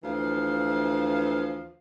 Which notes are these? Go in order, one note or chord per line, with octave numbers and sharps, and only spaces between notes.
D2 E3 F3 F5